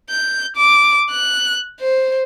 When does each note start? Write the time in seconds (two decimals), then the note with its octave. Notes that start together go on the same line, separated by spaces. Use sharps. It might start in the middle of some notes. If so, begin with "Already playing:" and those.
0.11 G6
0.57 D6
1.11 F#6
1.80 C5